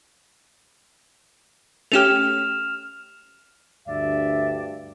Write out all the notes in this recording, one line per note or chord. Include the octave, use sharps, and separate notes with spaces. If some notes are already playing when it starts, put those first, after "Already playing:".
A3 C#4 G4 F6 E7 F7
D2 G2 D5 E5